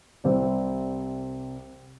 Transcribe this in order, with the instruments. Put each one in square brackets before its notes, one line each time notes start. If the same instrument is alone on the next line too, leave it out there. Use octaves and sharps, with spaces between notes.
[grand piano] C2 C3 G3 C4